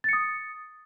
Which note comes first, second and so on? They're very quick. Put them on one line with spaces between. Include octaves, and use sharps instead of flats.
A6 C#7 D#6